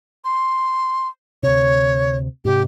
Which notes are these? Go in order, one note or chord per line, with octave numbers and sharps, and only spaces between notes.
C6
D2 C3 C#5
G#2 C3 G4